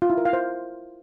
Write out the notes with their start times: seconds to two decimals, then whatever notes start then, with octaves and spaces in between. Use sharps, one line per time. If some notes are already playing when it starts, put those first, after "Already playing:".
0.02 F4
0.10 E4
0.18 A#4
0.25 F5
0.33 C5